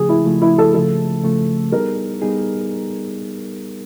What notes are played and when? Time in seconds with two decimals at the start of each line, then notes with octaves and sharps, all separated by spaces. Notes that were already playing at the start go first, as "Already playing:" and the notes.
Already playing: C#3 F3 A3 G#4
0.09 E4
0.25 C#3 F3 A3
0.42 E4
0.58 A4
0.74 C#3 F3 A3 A4
1.23 C#3 F3 A3
1.72 G3 B3 D#4 G#4 A#4
2.22 G3 B3 D#4 G#4